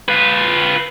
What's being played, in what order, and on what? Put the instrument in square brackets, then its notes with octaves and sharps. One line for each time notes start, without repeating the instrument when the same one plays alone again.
[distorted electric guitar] F4 B4